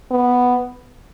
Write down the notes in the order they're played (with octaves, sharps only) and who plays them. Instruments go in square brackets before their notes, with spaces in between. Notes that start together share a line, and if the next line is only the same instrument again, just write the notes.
[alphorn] B3